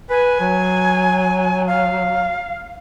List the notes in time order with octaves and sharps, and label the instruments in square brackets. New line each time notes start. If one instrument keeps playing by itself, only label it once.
[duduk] B4 [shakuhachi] G#5
[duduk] F#3
[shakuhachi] F5